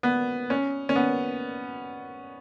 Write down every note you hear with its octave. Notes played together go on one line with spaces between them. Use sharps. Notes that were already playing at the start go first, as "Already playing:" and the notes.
B3
C#4
C#4
B3